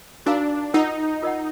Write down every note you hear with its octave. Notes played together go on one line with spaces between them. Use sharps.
D4 D#4 F#4 A#4 F5 A#5
D#4 F4 A#4 D#5 F#5
F4 A#4 D#5 F#5